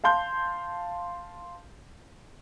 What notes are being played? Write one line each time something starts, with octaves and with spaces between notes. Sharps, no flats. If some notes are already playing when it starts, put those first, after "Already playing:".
F5 A5 C6 G6